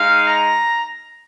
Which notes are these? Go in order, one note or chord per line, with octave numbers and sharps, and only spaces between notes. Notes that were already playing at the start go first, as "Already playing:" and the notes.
Already playing: G#3 D#4 F5
A#5